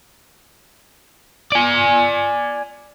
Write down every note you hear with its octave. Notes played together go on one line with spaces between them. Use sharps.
D5 G#5